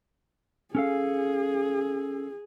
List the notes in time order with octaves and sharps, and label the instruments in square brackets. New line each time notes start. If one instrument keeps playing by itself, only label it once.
[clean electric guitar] C#4 A4 F5 [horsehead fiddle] G#4